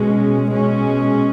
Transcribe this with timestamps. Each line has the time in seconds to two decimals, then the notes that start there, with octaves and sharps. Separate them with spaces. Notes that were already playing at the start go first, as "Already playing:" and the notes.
Already playing: B2 G#3 C#4
0.48 B2 G#3 C#4